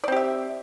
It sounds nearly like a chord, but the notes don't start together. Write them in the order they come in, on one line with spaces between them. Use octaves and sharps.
D5 C4 G4 E5